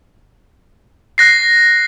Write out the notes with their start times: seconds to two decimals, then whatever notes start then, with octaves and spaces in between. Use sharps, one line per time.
1.18 F#6 A#6 C7